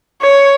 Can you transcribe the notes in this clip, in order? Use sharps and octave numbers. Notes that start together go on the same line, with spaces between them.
C#5